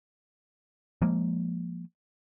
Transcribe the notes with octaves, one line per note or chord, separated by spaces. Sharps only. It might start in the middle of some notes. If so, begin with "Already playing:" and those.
F3 G#3 A#3